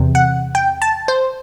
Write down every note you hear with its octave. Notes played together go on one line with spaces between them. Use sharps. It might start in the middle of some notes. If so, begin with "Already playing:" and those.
Already playing: E2 C3
F#5
G5
A5
C5